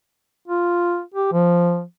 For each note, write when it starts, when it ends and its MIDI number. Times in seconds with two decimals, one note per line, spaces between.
0.48 1.01 65
1.14 1.31 67
1.32 1.82 53